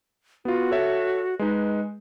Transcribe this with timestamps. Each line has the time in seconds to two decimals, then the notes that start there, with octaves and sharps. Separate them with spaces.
0.45 B3 F4 F#4
0.71 A4 C#5 E5
1.39 G#3 D#4 B4